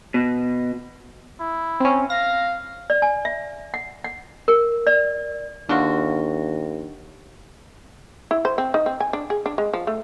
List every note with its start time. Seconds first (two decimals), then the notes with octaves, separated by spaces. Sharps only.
0.14 B2
1.40 E4
1.80 C4 C#4
2.10 F5 A#6
2.90 D5
3.02 G#5
3.25 E5
3.74 F#5
4.04 F#5
4.48 A#4
4.87 D5
5.69 D#2 D3 D4 F4 F#4
8.31 E4
8.45 C5
8.58 C4
8.74 D#4
8.86 C4
9.00 G#5
9.13 D4
9.30 G#4
9.46 D4
9.58 G#3
9.74 F3
9.87 A3